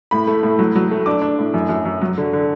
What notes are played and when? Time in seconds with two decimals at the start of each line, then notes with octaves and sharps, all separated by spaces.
0.11 A2 B5
0.27 A3
0.43 A2
0.59 F#3
0.76 F#3
0.91 A3
1.06 D4 D6
1.22 D4
1.39 A2
1.54 F#2
1.69 F#2
1.85 F#2
2.01 F#3
2.18 D3
2.33 D3